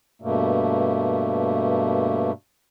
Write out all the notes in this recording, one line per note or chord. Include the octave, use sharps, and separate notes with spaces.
G2 B2 A3 A#3